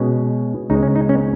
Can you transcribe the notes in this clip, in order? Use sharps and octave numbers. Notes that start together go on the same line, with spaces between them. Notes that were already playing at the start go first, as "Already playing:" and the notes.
Already playing: B2 G#3 C#4
C#2 C#3 G#3 C#4 D#4
C#4
D#4
C#4